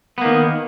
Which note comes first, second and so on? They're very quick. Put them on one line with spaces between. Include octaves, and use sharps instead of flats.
B3 A#3 D#3